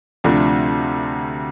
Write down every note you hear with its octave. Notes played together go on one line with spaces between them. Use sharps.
D2 C3 F3 A3 D4